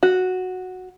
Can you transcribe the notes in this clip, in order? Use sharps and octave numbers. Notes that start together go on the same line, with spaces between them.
F#4